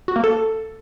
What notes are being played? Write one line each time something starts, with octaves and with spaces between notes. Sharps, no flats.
F#4
A#3
A4